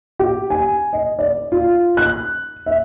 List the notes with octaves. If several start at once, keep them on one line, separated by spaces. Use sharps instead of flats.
G4
G#5
D#5
D5
F4
F#6
E5